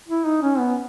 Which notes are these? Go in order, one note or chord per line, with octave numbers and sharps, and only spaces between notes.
E4
D#4
C#4
B3